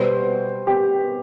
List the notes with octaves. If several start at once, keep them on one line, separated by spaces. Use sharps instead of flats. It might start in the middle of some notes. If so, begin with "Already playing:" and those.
Already playing: B2 G3 B3 C5
G4